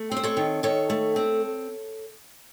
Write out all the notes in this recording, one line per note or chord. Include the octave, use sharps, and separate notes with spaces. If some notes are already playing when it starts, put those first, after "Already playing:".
Already playing: A3
C4
C5
A4 C#5
D#3
D#3 A4 C#5
A3
C4